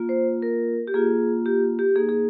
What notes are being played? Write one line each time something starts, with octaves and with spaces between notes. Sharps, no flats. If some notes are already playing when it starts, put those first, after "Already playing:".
Already playing: A#3 F4
C5
A#4
G4
A#3 F4 G#4
G4
G4
A#3 D#4 G#4
G#4